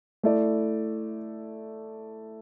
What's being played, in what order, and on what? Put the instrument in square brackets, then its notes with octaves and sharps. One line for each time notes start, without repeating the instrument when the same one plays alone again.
[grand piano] A3 E4 A4 D5